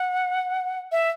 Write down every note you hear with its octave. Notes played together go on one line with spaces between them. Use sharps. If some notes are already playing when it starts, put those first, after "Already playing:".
Already playing: F#5
E5